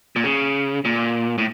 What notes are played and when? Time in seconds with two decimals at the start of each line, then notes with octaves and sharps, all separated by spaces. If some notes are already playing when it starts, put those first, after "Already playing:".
0.16 A#2
0.24 C#3
0.85 A#2
1.38 A2